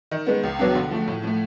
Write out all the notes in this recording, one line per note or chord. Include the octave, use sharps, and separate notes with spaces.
D#3
G#3 B3
C#2
B2 F#3 B3 D4
D3
F3 A3
A2
F3 A3